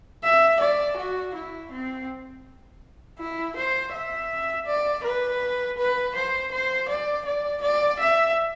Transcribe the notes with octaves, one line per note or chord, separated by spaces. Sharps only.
E5
D5
F#4
E4
C4
E4
C5
E5
D5
B4
B4
C5
C5
D5
D5
D5
E5